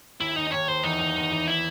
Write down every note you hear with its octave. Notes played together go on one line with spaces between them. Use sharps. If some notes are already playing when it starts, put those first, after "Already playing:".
D#2 E4
D#2 D#4
D#5
D#2 C#5
D#2 C5
E2 D#4
E2
E2
E2
E4